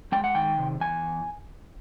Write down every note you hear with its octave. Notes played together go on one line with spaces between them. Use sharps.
G#3 G5
F#5
D#3 G5
C3
E2 G#5